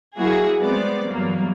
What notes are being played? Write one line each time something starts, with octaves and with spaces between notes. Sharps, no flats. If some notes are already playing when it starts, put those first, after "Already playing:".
F#3 A#3 E4 F#4 G#4
G3 G#3 B3 C4 D5
E2 G2 F#3 A#3